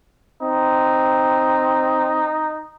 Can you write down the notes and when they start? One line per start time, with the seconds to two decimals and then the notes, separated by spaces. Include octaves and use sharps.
0.42 C4 D#4